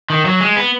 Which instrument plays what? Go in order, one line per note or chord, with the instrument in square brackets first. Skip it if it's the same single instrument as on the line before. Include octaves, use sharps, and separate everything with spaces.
[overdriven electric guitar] D#3
F#3
G#3
B3